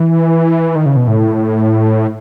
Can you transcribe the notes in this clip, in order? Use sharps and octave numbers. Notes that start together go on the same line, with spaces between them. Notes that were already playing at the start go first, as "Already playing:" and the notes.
Already playing: E3
D#3
C#3
B2
A2